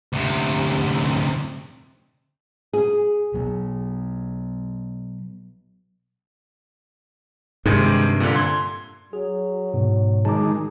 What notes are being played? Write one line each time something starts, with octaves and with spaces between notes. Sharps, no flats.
D2 C3
G#4
B2 F#3 B3
G2 C3 D#3 G#3
A#2 D3
C6 G#6
F#3 G#4
G#2 B2 B3
D#3 G#3 A5 A#5 D6